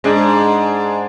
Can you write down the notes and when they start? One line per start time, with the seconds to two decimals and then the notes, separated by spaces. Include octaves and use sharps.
0.04 G#2 G#3 D4 G#4 D5